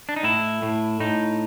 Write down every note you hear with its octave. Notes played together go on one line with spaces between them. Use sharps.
D4
D#4
A2 E4
A2
A2 D#4